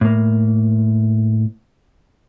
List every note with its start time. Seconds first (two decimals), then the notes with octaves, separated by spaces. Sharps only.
0.01 A2 A#3